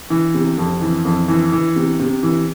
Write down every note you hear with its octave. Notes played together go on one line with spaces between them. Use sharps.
E3
C3
F2
E3
F2
E3
E3
C3
C3
E3